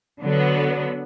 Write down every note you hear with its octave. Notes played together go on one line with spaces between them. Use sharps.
D3 F#3 B3